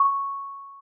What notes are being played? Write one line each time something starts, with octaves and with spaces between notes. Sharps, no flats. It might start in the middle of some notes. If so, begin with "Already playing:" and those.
Already playing: C#6